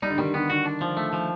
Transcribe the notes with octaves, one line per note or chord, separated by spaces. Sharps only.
G3 D#4
D3
D#3 G3
D3 B3
D3 F#4
D4
F3
A3
F3